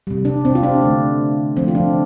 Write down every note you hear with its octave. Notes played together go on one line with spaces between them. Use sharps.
C3 G3
D4
C4
F4
D4
D3 A3
D3 F3 A3 C4
F4
D4